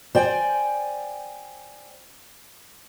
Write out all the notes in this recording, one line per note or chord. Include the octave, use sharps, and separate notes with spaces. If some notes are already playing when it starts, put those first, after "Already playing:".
C5 D5 G5 G#5